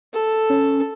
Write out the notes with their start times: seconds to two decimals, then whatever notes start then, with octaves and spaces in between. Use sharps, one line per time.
0.14 A4
0.50 C#4